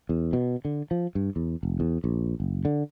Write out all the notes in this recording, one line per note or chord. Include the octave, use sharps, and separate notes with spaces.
E2
B2
D3
F3
G2
E2
F1
E2
A#1
F#1
D3